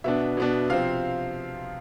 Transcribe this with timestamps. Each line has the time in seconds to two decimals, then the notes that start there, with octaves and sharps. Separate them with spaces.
0.04 B2 B3 D4 E5
0.37 B2 B3 D4
0.69 C3 F3 C4 F5